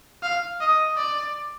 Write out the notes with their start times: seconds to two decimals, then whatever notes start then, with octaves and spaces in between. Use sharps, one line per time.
0.23 F5
0.61 D#5
0.97 D5